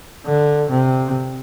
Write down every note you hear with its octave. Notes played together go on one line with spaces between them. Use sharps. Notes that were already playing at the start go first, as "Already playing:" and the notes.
D3
C3